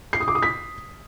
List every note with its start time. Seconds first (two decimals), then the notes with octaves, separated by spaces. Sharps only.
0.13 C7
0.20 D#6
0.28 D6
0.35 D#6
0.43 B6